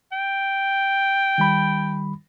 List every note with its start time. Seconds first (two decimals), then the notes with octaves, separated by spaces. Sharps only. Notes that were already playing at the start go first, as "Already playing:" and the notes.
0.12 G5
1.38 D#3 G3 B5